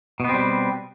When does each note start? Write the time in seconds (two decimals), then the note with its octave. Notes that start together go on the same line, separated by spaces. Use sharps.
0.20 B2
0.24 B3
0.29 C4
0.34 G3